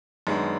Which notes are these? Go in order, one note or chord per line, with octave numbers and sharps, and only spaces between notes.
F#2 D#3 G#3 B3 D4